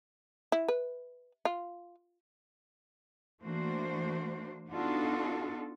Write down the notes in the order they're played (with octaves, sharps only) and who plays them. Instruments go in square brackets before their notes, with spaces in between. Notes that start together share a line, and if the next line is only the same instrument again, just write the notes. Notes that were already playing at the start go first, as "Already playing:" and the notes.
[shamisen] E4
B4
F4
[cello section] E3 A3 A#3 D4 F#4 C5
B3 D4 D#4 F4 F#4 A4